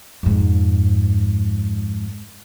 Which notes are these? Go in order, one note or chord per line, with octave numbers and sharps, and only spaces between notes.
F2 G#2